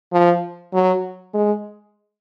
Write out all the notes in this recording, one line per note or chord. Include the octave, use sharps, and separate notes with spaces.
F3
F#3
G#3